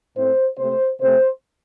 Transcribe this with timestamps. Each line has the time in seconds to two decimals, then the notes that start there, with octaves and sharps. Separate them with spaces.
0.16 A2 A3 C4 C5
0.58 C3 A3 C4 C5
1.00 C3 A3 C4 C5